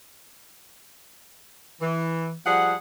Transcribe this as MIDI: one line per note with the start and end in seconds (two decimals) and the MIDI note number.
1.81 2.32 52
2.46 2.74 53
2.46 2.74 55
2.46 2.74 68
2.46 2.74 78